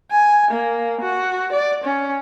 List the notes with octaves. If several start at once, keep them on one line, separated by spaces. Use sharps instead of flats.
G#5
A#3
F#4
D5
C#4